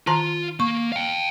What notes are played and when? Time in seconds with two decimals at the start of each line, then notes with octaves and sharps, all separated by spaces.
0.07 D#3 F4 A5 A#5
0.60 A#3 C#6
0.92 F5 G5